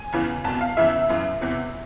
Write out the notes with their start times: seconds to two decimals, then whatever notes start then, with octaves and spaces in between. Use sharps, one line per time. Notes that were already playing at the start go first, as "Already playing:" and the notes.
Already playing: G#5
0.13 E2 C#3 E3
0.44 C2 B2 A5
0.61 F5
0.77 E2 C#3 E3 E5
1.09 F#2 C#3 E3
1.41 E2 C3 E3